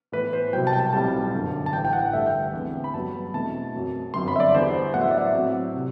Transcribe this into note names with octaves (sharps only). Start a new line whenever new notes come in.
A2 E3 B3 B4
C5
C2 B2 F#3 G5
A5
G5
A5
B1 A2 G3 C4 A5
G1 F#2 D3
A5
A1 A2 E3 G5
G5
F#5
A1 G2 D3 A3 E5
G5
E2 D3 A3 C4
B5
G2 F#3 B3 A5
E2 B2 A3 C4 A5
F#2 F#3 C4
G1 F#2 F#3 C4 C6
B5
E5
D5
E2 D3 G3 B3 C5
A2 F#3 B3 F#5
E5
D5
E5
A2 F#3 C4
C3